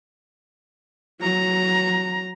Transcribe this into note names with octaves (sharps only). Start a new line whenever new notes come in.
F#3 A#5